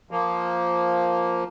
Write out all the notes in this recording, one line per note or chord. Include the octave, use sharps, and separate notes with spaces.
F3 A#3